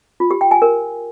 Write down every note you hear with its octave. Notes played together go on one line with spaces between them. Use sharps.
F4
G4
G5
G#5
A#4